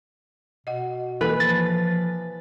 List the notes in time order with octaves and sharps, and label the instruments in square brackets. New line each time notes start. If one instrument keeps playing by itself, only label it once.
[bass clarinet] B2 [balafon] D#5 F#5
[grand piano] E3 [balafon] A#3 A4 [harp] B4
[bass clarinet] F3 [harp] A6